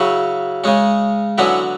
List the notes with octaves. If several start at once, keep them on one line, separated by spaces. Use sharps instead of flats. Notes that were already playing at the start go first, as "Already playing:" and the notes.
Already playing: C#3 F#3 C#4 E4
C#3 G#3 C#4
D3 F#3 B3 C#4 E4